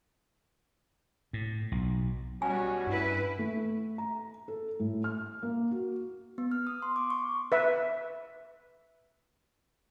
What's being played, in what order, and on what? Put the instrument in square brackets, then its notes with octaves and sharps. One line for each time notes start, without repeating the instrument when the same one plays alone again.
[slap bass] A2
B1
[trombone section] B2 C#4 F#4 [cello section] G3 [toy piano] G#5
[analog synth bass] G2 [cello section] E4 B4
[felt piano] A3
A#5
A4
A2
F6
A#3
F#4
[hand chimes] B3
F6
D#6
C6
D6
C#6
[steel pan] B4 E5